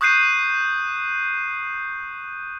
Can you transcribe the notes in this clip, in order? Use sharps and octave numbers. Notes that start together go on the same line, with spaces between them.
C#6 D#6 F#6 G6 C7 D#7